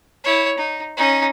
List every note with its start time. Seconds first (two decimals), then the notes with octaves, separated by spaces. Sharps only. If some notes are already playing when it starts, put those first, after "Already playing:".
0.24 E4 C#5
0.58 D#4
0.97 C#4 D#4